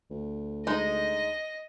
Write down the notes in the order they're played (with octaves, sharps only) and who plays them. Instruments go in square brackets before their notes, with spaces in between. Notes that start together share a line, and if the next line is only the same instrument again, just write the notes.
[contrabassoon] D2
[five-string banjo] G#3 D#4 [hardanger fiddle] D#5